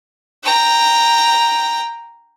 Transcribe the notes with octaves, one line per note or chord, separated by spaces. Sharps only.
G5 A#5